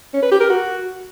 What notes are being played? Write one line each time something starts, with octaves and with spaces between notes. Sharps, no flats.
C#4
B4
G4
A#4
F#4